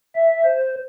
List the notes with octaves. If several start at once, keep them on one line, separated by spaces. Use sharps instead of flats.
E5
C5